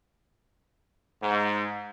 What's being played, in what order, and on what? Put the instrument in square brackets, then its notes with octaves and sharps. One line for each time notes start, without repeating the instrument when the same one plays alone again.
[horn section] G#2